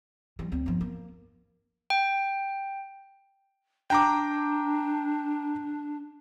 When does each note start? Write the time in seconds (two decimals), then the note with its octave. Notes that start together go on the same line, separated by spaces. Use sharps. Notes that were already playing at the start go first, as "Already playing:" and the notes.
0.39 E3 G3
0.52 D2 C4
0.66 G1 F3
0.81 A#3
1.90 G5
3.90 D4 G5 A#5 D6